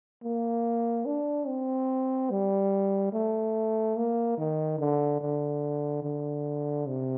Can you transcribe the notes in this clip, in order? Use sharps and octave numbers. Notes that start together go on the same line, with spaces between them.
A#3
D4
C4
G3
A3
A#3
D#3
D3
D3
D3
C3